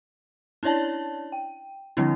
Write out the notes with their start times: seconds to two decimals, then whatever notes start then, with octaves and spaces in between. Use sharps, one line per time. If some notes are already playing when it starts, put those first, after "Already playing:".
0.63 C#4 D4 E4 C#5 D5 A5
1.32 G5
1.97 D3 F3 G3 C4 D4 E4